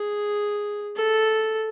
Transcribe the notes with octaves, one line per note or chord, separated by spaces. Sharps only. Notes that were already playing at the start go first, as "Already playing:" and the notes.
Already playing: G#4
A4